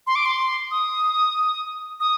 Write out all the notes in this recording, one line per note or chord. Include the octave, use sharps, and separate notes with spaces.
C6
D6
C6
D#6
D#6